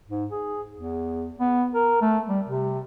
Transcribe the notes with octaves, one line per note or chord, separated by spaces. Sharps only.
G#2
G#4
E2
B3
A#4
A3
G3
C3